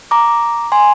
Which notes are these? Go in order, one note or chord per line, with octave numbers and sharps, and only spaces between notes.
A#5 D6
G#5 C6